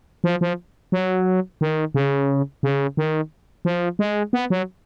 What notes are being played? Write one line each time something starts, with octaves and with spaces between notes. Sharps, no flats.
F3
F3
F#3
D#3
C#3
C#3
D#3
F3
G#3
B3
F#3